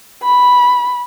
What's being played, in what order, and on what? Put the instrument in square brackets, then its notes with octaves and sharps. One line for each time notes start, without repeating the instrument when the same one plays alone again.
[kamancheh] B5